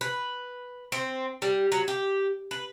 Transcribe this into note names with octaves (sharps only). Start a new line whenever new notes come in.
B4
C4
G3
F#3
G4
B4